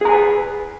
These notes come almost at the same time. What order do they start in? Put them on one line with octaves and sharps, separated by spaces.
G#4 A#5 G#5 B4